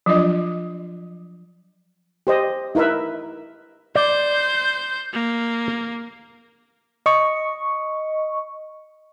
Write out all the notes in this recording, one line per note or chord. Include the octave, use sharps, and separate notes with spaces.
F3 F#3 D4 F4 D5 D#5
G4 C5 D#5
D#4 E4 A#4 B4 E5
C5 D5 G6
A#3
D#5 C#6